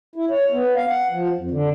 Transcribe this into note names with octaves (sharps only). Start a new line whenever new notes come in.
E4
C#5
B3
F5
F#5
F3
F2
D3